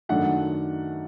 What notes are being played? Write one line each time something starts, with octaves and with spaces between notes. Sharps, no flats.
F#2 D#3 F#3 A3 D4 F#5